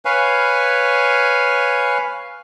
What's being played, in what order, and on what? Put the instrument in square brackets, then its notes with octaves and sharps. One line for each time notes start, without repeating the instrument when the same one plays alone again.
[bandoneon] B4 C#5 F5 G#5